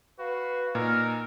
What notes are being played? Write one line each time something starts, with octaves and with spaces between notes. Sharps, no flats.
F#4 B4 F5
A#2 D#4 A#4 F6